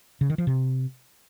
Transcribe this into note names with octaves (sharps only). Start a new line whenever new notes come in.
C#3
D#3
F3
C3